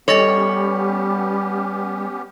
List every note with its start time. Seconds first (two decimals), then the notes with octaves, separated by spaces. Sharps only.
0.08 G3 B3 C#4 G4 A4 C#5 D#5 A6